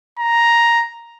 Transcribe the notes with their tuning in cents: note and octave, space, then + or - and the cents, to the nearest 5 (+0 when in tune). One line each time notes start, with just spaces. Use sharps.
A#5 +5